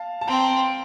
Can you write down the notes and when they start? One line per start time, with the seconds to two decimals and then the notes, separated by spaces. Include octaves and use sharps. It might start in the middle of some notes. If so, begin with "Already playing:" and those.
Already playing: F5 A5
0.21 A5
0.27 C4 G5 A#5